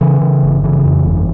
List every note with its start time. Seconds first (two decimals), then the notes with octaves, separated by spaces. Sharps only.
0.01 C#3 E3
0.21 C#3
0.43 G1
0.64 C#3 E3
0.85 F2
1.05 G1